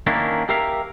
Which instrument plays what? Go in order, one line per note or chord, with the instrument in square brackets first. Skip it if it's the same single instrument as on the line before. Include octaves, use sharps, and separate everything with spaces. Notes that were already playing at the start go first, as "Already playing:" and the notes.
[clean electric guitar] D#3 A#3 C#4 D4 E4
G4 A#4 E5 F5